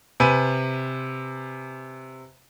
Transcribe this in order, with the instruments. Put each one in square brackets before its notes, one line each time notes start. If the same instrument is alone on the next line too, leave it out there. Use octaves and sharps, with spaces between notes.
[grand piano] C3 B4 G#5 D#7